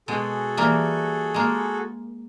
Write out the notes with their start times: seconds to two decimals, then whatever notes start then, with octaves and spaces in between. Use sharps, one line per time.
0.08 B2 G#3 F#4 G#4 A4
0.57 E3 G3 A#3
1.34 G#3 A#3